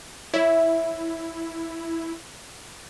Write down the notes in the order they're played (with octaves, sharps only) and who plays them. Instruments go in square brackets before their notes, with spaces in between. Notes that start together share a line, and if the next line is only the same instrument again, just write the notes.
[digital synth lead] E4 [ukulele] C#5 E5